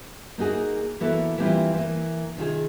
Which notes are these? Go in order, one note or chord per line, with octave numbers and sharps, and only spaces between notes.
A#3 D#4 F#4 G#4
E3 A#3 B3 E4 F#4 A4
E3 G3 A#3 C4 E4 F4
E3 A#3
C3 D#3 F4 G#4